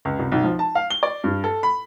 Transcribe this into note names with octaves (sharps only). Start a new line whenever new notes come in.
C#2
C2
B1
F3
A5
F5
G7
D5
G2
A4
B5